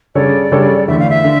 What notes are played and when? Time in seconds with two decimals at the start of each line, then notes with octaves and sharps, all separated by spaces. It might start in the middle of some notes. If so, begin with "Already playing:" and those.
0.15 C#3 G3 D4 A4 C#5 D5
0.52 C#3 G3 D4 A4 C#5
0.88 E2 D3 A3 E4 E5
0.99 F5
1.10 E5
1.24 D3